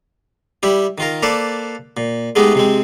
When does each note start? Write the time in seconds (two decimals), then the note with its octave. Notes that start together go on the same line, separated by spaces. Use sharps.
0.63 G3 E4 G4
0.98 D#3 F4 A#4
1.23 A#3 A4 B4 C5 D5 A5
1.97 A#2
2.36 G#3 A3 B3 D#4 G4 G#4
2.55 C3 G#3 C4